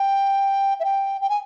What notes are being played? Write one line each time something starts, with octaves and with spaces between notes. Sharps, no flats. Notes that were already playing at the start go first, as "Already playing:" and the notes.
Already playing: G5
E5
G5
G5
G#5